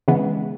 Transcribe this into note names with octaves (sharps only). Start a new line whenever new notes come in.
C#3 E3 G#3 B3